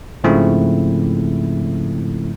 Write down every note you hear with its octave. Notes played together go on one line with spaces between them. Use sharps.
G#2 C#3 F3 A3 C4 E4